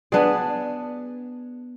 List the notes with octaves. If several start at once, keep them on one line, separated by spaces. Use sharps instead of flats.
B3 D4 G#4 D5